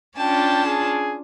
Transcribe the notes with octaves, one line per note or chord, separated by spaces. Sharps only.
C#4 D4 F4 G5 A5
G#4